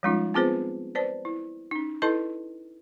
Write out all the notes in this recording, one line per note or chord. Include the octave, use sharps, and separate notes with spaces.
F3 G3 G#3 C#4 D#4 F4
B3 C4 F4 G#4 B4 C5
B4 C5 D5 A5
E4
C#4 D#4
E4 A4 B4 D#5 A5 C6